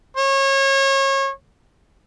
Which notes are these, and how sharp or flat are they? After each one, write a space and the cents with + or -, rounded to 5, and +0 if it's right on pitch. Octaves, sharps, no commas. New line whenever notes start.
C#5 -30